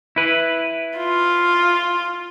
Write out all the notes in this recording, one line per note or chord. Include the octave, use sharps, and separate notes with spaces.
E4 B4
F4